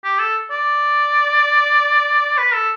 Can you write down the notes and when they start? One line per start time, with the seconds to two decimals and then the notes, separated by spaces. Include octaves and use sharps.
0.04 G4
0.19 A4
0.51 D5
2.38 B4
2.54 A4